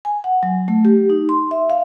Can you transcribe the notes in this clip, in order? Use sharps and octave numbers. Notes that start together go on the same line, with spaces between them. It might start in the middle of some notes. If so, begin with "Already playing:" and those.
G#5
F#5
F#3
A3
G4
D#4
C6
E5
F5